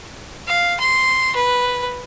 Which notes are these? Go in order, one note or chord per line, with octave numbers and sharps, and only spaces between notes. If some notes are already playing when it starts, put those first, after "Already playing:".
F5
C6
B4